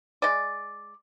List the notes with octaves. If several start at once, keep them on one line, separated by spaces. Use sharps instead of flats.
G#3 D5